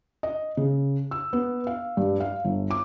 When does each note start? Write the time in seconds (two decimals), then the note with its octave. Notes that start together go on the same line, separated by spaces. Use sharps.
0.23 D#5
0.57 C#3
1.11 E6
1.33 B3
1.67 F5
1.97 G2
2.20 F5
2.45 G1
2.71 D6